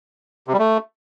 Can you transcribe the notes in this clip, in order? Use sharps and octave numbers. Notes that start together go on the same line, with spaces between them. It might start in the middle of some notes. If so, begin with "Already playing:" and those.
C3
G3
A3